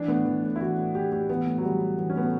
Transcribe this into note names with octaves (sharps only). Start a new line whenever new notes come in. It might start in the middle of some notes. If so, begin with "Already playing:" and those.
Already playing: E3 D4
A2 B3
E3
A2
E4
E3 F#4
A2
E3 G4
A2 G4
E3 B3
A2
F#3
E3 G3
A2
E3
C#4
A2 B3
A3